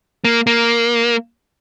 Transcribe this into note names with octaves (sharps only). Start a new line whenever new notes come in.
A#3
A#3